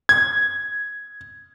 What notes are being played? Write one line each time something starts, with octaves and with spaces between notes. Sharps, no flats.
G#6